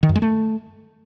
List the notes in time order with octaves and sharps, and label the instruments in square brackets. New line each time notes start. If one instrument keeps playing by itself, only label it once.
[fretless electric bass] D#3
F#2
G#3
A3